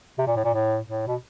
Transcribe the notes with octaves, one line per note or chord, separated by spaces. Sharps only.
C3
A#2
A2
A#2
A2
A2
B2